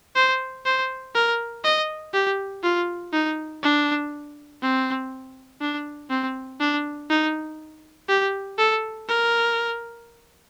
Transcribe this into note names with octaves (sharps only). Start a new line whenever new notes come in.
C5
C5
A#4
D#5
G4
F4
D#4
D4
C4
D4
C4
D4
D#4
G4
A4
A#4